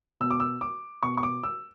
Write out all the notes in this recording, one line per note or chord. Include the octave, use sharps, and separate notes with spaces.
B2 E6
D6
E6
D6
B2 C#6
C#6
D6
E6